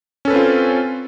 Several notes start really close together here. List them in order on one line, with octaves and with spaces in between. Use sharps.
C#4 A4 B4 C4 F4